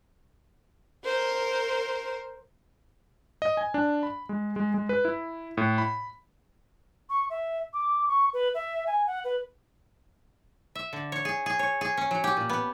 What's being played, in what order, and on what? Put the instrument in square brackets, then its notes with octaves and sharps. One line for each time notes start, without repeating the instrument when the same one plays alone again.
[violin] A#4 C5
[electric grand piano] D#5
G#5
D4
B5
G#3
G#3
G#3
B4
E4
A2
B5
[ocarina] C#6
E5
D6
C#6
B4
E5
G#5
F#5
B4
[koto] E5
D3
C#5
G#4
G#4
C#5
G#4
C#4
F#3
G4
A#2
B3